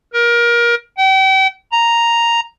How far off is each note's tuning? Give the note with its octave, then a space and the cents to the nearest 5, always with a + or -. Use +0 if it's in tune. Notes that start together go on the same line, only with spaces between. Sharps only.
A#4 +25
G5 -40
A#5 +0